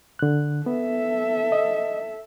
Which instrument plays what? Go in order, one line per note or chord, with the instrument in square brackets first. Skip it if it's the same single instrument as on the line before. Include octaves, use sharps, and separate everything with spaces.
[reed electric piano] D3 F#6
[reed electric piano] B3 [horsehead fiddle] A4 E5
[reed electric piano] D#5